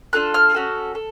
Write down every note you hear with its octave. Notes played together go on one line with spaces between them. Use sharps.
D4 F4 A4 F#6
F6
C#4 F#4 A4
A4